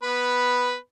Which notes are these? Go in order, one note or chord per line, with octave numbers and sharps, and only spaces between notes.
B3 B4 B5